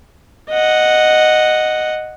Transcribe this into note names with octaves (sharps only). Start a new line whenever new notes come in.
D#5 F#5